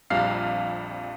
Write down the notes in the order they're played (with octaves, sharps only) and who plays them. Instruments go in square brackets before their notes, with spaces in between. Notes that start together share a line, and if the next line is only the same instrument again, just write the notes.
[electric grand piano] A#1 F2 G3 F5 F6 C7